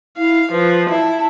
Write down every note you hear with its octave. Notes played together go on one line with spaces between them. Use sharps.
E4 F5
F3 B4
E4 A5